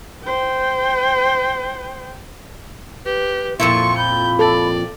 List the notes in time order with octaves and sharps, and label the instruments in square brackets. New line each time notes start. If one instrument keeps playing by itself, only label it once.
[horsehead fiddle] C5 G5
[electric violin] G4 [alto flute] B4
[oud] F2 A#2 E4 [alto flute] C6 [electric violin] C#6 C#7
[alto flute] B5 [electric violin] G6
[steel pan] A4 [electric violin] D5